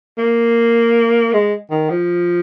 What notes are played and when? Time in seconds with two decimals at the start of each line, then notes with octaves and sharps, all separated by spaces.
0.18 A#3
1.33 G#3
1.71 D#3
1.90 F3